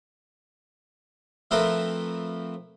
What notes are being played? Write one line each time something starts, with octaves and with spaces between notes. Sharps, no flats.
F3 A3 C4 E4 A#4 B4